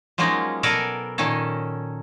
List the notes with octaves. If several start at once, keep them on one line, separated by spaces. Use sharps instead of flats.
F3 F#3 G#3 A#3 C#4 D#4
B2 A4 A#4 D5 G#5
A#2 D#3 C#4 A4